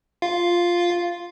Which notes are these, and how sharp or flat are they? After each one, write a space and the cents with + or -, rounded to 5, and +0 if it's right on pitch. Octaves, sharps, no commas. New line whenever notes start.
F4 +0 F5 +0